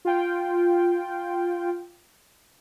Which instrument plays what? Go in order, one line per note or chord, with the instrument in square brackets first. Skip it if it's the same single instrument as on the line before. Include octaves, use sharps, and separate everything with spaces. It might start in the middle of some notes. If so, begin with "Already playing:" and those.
[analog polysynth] F4 G5